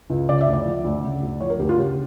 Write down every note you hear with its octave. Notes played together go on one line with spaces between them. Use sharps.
C#2
C#3 D5
E5
D2
D5
F3
D2
C#3
D2
F3 C#5
A#4
D2 G4
F4
C#3 G4